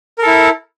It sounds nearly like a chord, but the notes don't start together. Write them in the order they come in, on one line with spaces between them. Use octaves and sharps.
A#4 A4 E4